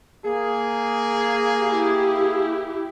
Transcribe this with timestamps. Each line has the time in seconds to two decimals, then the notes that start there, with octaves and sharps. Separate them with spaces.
0.25 A#3 G#4
1.63 E4 G4